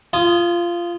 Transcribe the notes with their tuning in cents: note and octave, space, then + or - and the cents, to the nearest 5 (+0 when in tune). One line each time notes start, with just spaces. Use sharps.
F4 -15 G#5 +35 D#6 +0